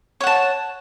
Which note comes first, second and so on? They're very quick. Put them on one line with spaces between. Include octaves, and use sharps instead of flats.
C#5 F#5 A5